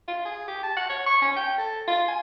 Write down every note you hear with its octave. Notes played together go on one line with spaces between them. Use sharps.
F4
G#4
G4
A5
F#5
C#5
C#6
C#4
G5
A4
F4
G#5